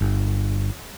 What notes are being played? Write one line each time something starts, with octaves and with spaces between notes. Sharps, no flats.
G1